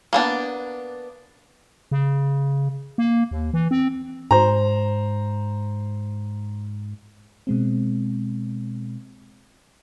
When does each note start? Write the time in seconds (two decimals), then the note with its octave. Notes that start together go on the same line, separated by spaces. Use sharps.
0.13 A#3 B3 D4
1.91 C#3
2.98 A#3
3.31 D#2
3.53 E3
3.71 C4
4.31 G#2 C5 A#5
7.47 B2 G#3 C4